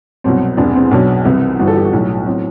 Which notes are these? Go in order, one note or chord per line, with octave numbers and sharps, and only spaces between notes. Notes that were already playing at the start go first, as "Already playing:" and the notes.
C2 B2 F#3 C4
E1 E2 C3 D4
C4
B1 B2 F#3 D4
C2 C3 E3 E4
G1 G2 E3 F#4
A4
G4
F#4
B1 A2 F#3
A2 F#3 C4